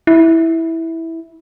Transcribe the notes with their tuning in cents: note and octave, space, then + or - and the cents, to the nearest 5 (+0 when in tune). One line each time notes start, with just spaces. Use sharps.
E4 -10